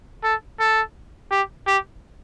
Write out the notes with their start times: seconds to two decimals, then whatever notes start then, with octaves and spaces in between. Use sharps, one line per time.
0.23 A4
0.60 A4
1.31 G4
1.67 G4